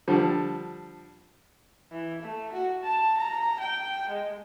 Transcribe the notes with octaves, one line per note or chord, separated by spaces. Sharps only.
D3 F3 G3
E3
A3
F#4
A5
A#5
G5
G#3